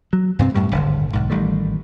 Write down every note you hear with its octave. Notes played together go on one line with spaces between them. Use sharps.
F#3
G2 C3 C4
F#2 A2 G3
D#1 G#1 D3
B1 G#2
A1 D#3 G3 A3